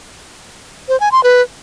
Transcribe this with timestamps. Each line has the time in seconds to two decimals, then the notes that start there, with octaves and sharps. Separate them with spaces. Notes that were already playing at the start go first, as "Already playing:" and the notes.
0.89 C5
1.00 G#5
1.12 C6
1.23 B4